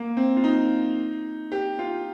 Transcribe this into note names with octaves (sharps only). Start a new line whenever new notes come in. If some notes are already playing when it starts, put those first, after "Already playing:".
Already playing: A#3
C4
F4
D#4
G4
F4